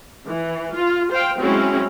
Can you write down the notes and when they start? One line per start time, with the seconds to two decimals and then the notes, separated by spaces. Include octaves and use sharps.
0.27 E3
0.74 F4
1.11 C5 F5 G5
1.40 F#3 G#3 C4 C#4 E4